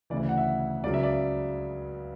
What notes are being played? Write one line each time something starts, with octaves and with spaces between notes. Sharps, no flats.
D2 C#3 E3 D5
F#5
E5
C#2 C#3 F#3 D5
E5
D5